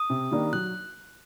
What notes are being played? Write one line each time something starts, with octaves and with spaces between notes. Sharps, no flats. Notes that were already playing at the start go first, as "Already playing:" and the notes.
Already playing: D#6
C3
D#3 G3 A#3 D4
F#3 F#6